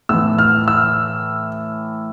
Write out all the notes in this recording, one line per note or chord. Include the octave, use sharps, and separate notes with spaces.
A2 E3 E6
F6
E6